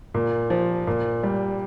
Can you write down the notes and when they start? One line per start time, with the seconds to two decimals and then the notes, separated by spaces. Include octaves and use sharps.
0.14 A#2
0.50 F3
0.87 A#2
1.23 G3